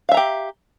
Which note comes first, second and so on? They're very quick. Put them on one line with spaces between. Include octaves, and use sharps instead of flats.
F5 E5 A#5 G4